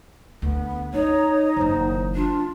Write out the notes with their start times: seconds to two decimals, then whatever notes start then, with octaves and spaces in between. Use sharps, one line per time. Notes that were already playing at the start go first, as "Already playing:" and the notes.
0.42 D2 B3
0.94 C#4 D#4 C#5
1.57 F#1 D#3 C5
2.15 D4 F4